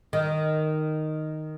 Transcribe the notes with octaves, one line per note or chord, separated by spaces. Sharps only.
D#3